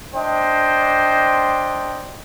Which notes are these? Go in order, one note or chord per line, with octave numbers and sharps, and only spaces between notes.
D4 C5 D#5 G5